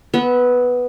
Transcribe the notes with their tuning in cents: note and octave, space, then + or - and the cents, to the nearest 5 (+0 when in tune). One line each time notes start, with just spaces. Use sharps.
B3 +0 E5 -35